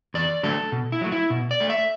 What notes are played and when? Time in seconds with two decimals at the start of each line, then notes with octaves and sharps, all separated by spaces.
0.14 E2 D5
0.43 D3 F#3 A3 A4
0.72 B2
0.92 E4
1.01 F#3 A3
1.12 E4
1.30 B2
1.51 D5
1.60 A3
1.70 E5